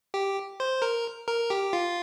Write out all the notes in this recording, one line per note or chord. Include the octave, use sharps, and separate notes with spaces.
G4
C5
A#4
A#4
G4
F4